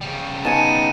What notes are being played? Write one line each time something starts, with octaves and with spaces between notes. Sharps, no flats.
C#3 G3
B3 D#4 G#5 A5 C#7 D#7 E7